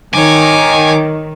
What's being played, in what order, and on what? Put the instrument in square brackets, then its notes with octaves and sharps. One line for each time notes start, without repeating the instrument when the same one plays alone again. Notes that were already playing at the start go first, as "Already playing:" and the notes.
[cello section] D#3 [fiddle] C#5 D6 [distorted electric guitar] G#5